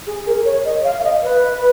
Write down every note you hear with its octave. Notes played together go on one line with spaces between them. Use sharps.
G#4
A#4
C#5
D#5
F5
F5
D#5
B4